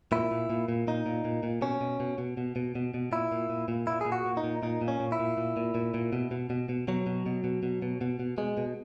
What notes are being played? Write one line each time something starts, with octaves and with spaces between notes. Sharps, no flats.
A#2 E4
A#2
A#2
A#2
A#2 D#4
A#2
A#2
A#2
B2 C#4
B2
B2
B2
B2
B2
B2
B2
A#2 E4
A#2
A#2
A#2
A#2 E4
A#2 G#4
F#4
A#2
D#4
A#2
A#2 D#4
A#2
C#4
A#2
E4
A#2
A#2
A#2
A#2
A#2
B2
B2
B2
B2
B2 F#3
B2
B2
B2
B2
B2
B2
B2
B2 G#3
B2